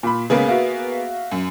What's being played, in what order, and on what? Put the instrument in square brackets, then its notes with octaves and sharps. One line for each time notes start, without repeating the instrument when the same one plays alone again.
[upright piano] A#2 B5
[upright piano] C#2 C#3 [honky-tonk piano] A#3 B3 G#4
[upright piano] F#4 E5 F5
[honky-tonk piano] F#2